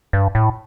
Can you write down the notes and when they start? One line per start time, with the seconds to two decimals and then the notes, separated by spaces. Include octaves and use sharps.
0.13 G2
0.35 A2